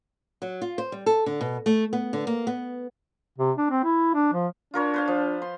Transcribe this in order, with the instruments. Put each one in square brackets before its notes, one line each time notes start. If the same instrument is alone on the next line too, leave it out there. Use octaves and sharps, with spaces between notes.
[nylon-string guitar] F#3
F4
C5
G3
A4
D3
B2
A3
B3
D3
A#3
B3
[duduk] C3
D4
C4
E4
D4
F3
[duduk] D4 [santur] F4 A#4 C#5
[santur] B4 C5 F5
F3
C6